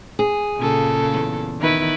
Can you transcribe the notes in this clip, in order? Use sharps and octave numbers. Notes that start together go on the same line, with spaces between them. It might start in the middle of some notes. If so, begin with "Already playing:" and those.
G#4
A#2 C#3 A4
E2
D#3 E4 B4